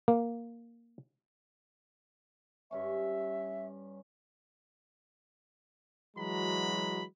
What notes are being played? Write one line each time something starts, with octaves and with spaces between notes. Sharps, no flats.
A#3
G2 C#4 E5 C#6
E3 F#3 G#3 F#4 A#5 B5